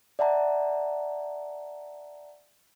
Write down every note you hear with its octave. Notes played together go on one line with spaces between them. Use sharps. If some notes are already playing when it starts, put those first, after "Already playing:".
D5 E5 F#5 A5 A#5